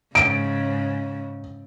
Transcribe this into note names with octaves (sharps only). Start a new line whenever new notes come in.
G#2 C#3 D7